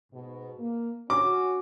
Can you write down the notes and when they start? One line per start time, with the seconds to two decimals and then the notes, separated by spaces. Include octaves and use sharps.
0.12 G#2 B2
0.58 A#3
1.10 C#4 F#4 D6